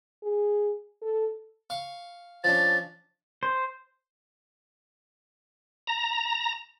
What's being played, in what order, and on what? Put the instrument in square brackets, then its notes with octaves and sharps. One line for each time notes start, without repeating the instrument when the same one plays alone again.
[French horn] G#4
A4
[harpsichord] F5 C#6
[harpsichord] F3 C#4 D4 [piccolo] A6
[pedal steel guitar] C5
[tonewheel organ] A#5